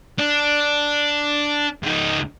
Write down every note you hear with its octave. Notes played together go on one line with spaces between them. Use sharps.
D4
C#2 D#4